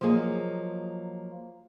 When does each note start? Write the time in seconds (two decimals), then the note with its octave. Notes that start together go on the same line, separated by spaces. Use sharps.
0.01 F3 F#3 A#3 G#4 D#5